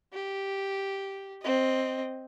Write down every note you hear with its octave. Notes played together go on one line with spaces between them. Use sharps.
G4
C4 D#5